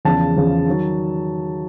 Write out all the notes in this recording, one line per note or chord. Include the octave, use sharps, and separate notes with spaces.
E2 C#3 F3 A5
E2 C#3 F3
D#3 F#3